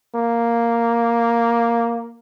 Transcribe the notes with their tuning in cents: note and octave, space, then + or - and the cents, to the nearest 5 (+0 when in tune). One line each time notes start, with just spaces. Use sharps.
A#3 +0